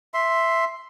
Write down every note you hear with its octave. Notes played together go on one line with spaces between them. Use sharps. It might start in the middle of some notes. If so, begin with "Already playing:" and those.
E5 C6